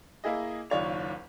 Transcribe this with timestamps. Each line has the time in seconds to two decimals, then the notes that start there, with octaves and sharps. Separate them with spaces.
0.24 A#3 E4 G#4 D#5
0.70 F#1 D#2 F4 C#5 D5 F7